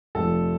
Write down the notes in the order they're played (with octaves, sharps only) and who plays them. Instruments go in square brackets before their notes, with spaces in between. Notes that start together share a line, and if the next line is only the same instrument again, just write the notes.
[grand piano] F1 F2 F3 A3 A4